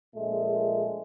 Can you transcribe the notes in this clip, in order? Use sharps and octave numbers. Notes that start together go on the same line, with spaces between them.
A#1 A#2 G#3 A3